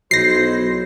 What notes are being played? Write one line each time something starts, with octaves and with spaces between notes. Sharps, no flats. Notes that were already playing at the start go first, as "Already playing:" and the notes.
B1 F#3 G#3 E4 C5 A#6 C7